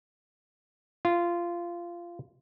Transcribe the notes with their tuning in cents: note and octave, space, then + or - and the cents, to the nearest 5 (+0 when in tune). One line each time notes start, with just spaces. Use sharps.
F4 -15